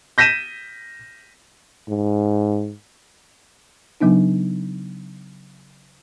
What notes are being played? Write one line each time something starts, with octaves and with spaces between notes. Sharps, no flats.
G6 A#6 B6 D#7 E7
G#2
C#3 F#3 B3 D4 D#4